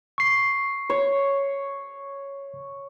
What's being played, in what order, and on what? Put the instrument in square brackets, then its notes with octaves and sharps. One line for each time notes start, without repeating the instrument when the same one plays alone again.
[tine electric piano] C#6 C7
[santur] C#5